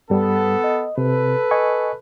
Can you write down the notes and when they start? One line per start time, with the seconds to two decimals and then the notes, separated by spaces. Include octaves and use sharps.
0.10 G2 G3 B3 A4
0.64 D#5
0.98 C3 A4 B4
1.51 D#5 G#5 C#6